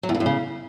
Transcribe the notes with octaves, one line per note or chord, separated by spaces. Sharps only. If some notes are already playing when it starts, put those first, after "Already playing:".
F#3
E2
G2
F#2
C#3